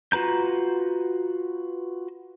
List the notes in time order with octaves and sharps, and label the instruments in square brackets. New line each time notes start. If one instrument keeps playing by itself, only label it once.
[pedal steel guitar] F4 F#4 B4 A#5 G6